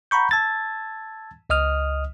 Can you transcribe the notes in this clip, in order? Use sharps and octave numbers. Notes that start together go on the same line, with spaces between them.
F#5 A#5 B5 C#6 G6
A5 E6 G#6 A6
C#2 D#5 D#6 F6